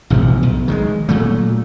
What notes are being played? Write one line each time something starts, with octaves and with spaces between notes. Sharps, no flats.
A1 G2 B2 F3
B1
D#3 F3 G#3
A#2 F#3 A3